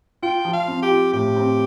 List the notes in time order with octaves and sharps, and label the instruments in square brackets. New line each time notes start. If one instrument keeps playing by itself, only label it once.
[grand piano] F4 [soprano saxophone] G5
[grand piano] F3
[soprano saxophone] F5
[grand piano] C4
[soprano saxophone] G4
[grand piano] F4
[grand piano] A2 [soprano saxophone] G4
[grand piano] C4